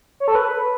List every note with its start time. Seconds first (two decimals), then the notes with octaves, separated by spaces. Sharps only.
0.20 C#5
0.28 A4
0.35 B4